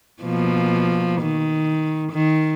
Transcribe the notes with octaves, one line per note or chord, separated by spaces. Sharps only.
B2 F3 A#3
D#3
D#3